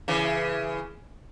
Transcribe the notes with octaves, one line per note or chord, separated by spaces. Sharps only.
C#3 E3